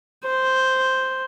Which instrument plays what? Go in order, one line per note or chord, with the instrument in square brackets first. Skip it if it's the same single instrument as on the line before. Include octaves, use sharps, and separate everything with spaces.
[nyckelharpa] C5